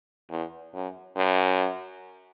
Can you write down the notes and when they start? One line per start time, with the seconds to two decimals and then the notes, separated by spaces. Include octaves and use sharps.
0.31 E2
0.74 F#2
1.16 F#2